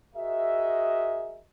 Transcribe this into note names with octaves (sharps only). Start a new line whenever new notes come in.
F#4 G#4 A#4 D#5 E5